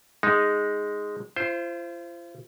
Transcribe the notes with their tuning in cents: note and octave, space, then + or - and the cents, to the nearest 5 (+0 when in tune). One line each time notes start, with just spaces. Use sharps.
G#3 -5 D#4 +0
F4 -40 C5 +0